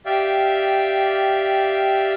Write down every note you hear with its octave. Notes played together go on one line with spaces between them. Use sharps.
G4 D5 E5 F5 G5